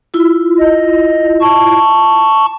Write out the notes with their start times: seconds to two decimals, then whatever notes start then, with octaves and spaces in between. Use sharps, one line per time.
0.14 E4 F4
0.59 D#5
1.41 A5 C#6